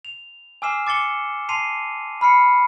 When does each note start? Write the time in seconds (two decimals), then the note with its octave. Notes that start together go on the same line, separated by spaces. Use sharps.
0.05 F7
0.62 G#5 D6 E6 F6 C7 E7
0.87 D6 A6 C#7 G7
1.49 A5 C6 C7 D#7 F7
2.21 B5 F6 C7 C#7